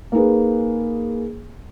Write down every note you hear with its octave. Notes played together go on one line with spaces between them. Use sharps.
A#3 D#4 G#4 B4